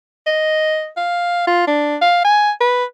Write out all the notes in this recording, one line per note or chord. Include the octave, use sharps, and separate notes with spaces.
D#5
F5
F4
D4
F5
G#5
B4